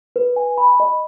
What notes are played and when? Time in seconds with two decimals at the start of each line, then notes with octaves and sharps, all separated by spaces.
0.16 B4
0.36 G#5
0.58 B5
0.80 D#5